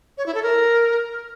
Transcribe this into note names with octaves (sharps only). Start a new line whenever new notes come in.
C#5
E4
A4
A#4